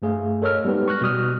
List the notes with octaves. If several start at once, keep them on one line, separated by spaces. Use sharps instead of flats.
G2 A3 G#4 F5
A4 A#4 C#5 D#5 E6 F6
G3 G#3 B3 D#4 G4 B4
C#6 F6 F#6 A#6
B2 G3 D#6 F6